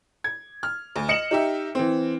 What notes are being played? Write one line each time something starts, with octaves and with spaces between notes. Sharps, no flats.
G#6
F6
D2
D#5 C#7 E7 F#7
D#4 G4 E5
E3 C4